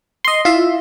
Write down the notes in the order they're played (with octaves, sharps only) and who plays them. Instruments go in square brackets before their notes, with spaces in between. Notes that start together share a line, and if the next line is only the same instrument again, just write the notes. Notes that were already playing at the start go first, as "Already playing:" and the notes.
[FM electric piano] D#5 C6
[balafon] E4 [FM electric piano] F4 E5